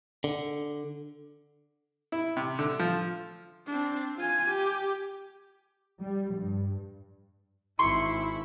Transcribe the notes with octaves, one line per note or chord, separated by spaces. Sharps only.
D3
E4
C3
D3
F3
C4 D4
F4 G#5
G4
G3
G2
G#1 E4 C6 C#6